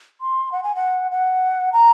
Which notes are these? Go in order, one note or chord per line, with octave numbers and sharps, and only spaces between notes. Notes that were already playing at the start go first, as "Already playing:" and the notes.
C6
F#5
G#5
F#5
F#5
A#5